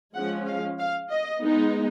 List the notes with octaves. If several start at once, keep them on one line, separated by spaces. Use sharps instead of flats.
F3 G#3 C#4 F#5
F5
F5
D#5
G#3 B3 D#4